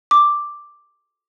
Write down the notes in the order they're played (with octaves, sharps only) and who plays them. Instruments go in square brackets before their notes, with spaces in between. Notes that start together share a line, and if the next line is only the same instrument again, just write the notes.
[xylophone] D6